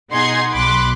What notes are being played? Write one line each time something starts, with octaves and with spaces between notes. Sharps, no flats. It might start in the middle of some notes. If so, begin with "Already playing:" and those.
B2 D#4 G#4 F#5 C6 G#6
B1 B5 C6 D6 F#6